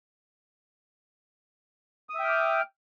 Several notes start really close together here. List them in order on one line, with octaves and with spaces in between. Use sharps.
D#6 E5 G5 F6 D6